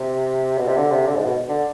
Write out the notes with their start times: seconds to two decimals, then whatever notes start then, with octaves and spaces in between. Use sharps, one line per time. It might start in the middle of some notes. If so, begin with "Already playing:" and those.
Already playing: C3
0.58 B2
0.68 C3
0.77 D3
0.91 C3
1.06 D3
1.16 G#2
1.25 B2
1.49 D3